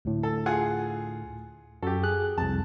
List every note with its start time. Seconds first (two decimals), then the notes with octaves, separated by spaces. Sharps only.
0.05 D2 A2
0.23 A4
0.46 F4 G#4 F#5
1.83 F#2 F#4 G4 A4
2.03 G#4 F#6
2.38 C2 F2 A5